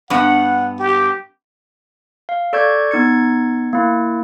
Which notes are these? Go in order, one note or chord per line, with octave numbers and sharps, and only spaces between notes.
G2 B3 F#5
G4
F5
A4 D5 C#6 G6 G#6
B3 D#4 G#6 C#7
A#3 E4